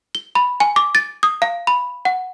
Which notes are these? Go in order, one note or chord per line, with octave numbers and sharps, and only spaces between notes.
G7
B5
G#5
D6
A6
D#6
F5
B5
F#5